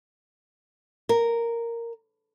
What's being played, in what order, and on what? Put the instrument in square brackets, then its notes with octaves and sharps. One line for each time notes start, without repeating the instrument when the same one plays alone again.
[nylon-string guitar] A#4